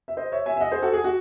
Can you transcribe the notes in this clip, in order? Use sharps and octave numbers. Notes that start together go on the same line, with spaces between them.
E5
C5 D#5
C#5 E5
E5 G#5
E5
D#5 F#5
G#4 C5
F#4 A4
G#4
F#4